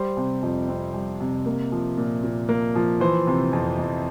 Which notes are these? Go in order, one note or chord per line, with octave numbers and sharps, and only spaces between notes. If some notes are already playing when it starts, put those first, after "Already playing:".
Already playing: G3 C5
C3
F2
C4
G3
C3
A#3
F3
A#2
A#2
A#3
F3
E3 C5
C3
F2
F2